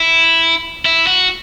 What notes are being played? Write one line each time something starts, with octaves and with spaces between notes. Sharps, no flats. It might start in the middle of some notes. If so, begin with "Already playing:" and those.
Already playing: E4
E4
F#4